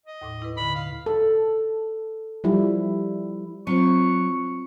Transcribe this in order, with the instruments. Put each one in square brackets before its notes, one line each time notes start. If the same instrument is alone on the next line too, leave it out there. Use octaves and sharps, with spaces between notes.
[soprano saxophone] D#5
[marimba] D#2 A2 D6
E4 B4
[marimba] B2 D3 [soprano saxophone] B5
[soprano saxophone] F5
[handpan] A4
F3 G3 E4
[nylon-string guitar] F#3 [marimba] C4 F4 C5 [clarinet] C#6